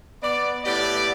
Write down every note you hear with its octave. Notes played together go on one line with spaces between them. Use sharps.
B3 D5
A2 B3 G4 D5